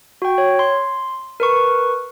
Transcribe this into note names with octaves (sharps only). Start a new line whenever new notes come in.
F#4 G5
C#5
C6
A#4 B4 C#6